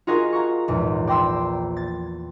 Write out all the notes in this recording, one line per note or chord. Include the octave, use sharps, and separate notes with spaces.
F4 F#4 G#4 A#4 D#5 F5
F5 A#5 C#6
A#1 E2 G#2
D5 G5 A#5 C6 E6
A6